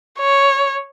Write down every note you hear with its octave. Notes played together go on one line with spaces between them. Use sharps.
C#5